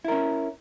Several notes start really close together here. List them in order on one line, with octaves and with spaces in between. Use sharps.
E4 A#4 C#4